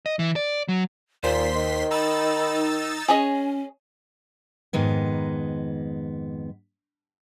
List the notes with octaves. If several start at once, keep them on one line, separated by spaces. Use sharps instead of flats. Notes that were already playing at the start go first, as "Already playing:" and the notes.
D#5
E3
D5
F#3
D#2 A#2 C5 C6 B6
D#3
D#4 B5 E6 A6
C#4 G#4 C#5 D#5
F2 G#2 D#3 G#3 B3